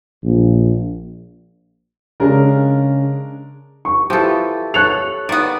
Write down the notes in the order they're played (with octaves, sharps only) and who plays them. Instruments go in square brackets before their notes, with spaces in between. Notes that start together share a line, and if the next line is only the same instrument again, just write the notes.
[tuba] A#1
[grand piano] C#3 [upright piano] G#3 D4 A#4
[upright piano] C#6
[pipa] E3 F3 [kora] G4 A4
[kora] A4 C#5 [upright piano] F#6 F7
[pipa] D#3 B3 [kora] D5